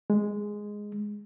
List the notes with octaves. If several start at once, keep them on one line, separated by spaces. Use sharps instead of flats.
G#3